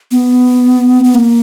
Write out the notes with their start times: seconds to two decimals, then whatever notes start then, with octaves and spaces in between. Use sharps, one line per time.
0.12 B3
1.04 B3
1.15 A#3